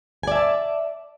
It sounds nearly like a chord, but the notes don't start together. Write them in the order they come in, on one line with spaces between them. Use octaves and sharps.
G#5 D5 E5 A5